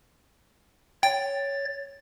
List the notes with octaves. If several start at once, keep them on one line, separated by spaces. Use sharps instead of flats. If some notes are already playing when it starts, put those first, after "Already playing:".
C#5 G5 A6